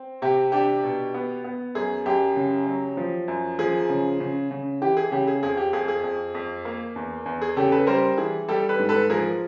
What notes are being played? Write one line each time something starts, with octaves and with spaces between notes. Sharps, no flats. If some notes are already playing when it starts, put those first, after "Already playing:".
Already playing: C4
C3 G4
D4 G4
B2
B3
B3
F#2 G#4
F#2 G4
C#3
F#3
F3
F#2
F3 G#4
C#3
C#3
C#3
E3 G4
G#4
C#3 G4
G#4
F2 G#4
G4
F2 G#4
G#4
F2
F2
A#3
E2
E2
G#4
C#3 G4 A4
A4 B4
G3 A#4 C5
E3 G#4
G3 G4 A4
A4 B4
G#2
A4 B4
F3 G#4 A#4